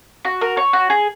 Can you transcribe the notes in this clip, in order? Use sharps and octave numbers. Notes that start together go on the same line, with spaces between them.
F#4
A#4
C#5
F#4
G#4